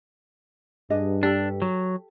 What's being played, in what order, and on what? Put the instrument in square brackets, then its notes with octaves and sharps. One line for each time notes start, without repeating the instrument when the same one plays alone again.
[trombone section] G2 [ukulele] D4 G#4 D#5
[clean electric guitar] D4 [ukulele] G4 A4 A5
[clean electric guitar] F#3